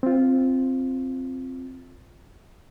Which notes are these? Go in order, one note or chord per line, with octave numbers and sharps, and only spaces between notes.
C4 F4